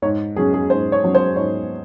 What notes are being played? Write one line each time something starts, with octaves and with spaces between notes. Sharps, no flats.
G#2 C#5
F#3 C#4 G#4
G#4
G#2 C5
C#5
F#3 C#4
C5
G#2 C#5